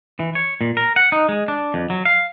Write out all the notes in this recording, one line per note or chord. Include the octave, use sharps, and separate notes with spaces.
E3
C#5
A#2
A#4
F#5
D#4
G#3
D4
F2
F#3
F5